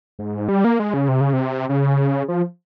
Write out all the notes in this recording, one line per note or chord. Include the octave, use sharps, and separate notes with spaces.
G#2
G3
A#3
G#3
C#3
C3
C#3
C3
C#3
F3